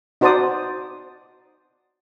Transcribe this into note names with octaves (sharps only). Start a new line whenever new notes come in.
D#4 F#4 C5 D5 A5 D#6